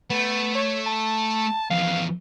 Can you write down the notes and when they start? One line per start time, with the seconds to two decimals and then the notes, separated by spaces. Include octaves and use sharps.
0.10 A3 B3
0.55 C#5
0.86 A5
1.70 F2 E3 F5